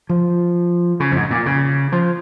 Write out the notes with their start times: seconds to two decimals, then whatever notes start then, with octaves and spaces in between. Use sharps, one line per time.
0.09 F3
1.00 C#3
1.12 F2
1.16 G#2
1.31 A#2
1.46 C#3
1.92 F3